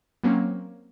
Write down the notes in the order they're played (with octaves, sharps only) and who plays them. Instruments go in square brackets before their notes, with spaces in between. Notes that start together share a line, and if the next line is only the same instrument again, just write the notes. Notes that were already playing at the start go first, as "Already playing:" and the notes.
[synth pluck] F#3 A#3 C4 C#4